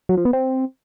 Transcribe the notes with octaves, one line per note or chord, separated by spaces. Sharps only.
F#3
F3
B3
C4